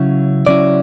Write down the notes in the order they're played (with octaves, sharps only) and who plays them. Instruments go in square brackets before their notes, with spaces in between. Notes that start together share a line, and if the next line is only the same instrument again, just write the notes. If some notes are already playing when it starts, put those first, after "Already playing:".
Already playing: [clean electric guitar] C#3 F#3 C#4 E4
C#3 F#3 C#4 E4 D5